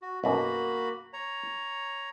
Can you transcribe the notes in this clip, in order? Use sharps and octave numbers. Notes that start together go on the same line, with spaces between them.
F#4
B1 F#2 A#3 F#4 B5
C#5 A#5